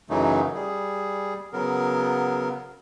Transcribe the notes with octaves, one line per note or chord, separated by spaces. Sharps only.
F#2 C#3 E3 F#3 A3 D#4
G3 G#4
C#3 F#3 B3 A#4